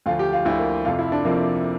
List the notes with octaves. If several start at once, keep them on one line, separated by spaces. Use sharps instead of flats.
D2 D3 F3 F4
G4
F4
D2 D3 F3 E4
A#3
F2 C3 F3 F4
E4
D4
F2 C3 F3 A#3